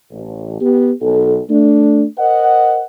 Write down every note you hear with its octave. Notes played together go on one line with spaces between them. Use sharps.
A1
B3 G4
B1 A4
A3 D4
A#4 C5 D#5 F#5